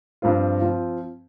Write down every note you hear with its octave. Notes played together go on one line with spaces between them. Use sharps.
G2 F3 C4 F4
F3 C4 F4